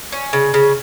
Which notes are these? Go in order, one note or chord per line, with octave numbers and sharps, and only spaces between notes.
C#4
C#3
C#3